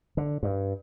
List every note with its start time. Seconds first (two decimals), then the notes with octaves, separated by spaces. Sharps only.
0.17 D3
0.43 G2